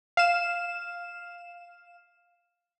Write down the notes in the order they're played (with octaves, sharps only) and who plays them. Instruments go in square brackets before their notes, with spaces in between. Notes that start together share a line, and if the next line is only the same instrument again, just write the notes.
[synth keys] F5 E7